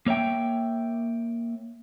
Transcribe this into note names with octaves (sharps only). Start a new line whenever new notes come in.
A#3 C#5 E5 G5